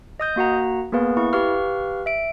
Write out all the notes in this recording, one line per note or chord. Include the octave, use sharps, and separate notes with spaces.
D#5 D#6 G6
A#3 F#4 F#5 A#5
A#3 B3 G#4 B4 F5
E4 C#6
G4 B4 F5 C#6 F6
E5 D7